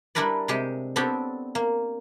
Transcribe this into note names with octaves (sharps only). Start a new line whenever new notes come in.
G3 D4 E4 A#4 B4 D5
C3 G#3 G4
B3 C4 D4 G4 A4 C#5
A#3